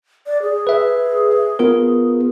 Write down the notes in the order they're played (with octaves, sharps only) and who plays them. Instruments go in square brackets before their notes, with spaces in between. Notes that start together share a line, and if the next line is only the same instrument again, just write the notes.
[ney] D5
G#4
[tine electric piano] B4 E5
B3 F4 A#4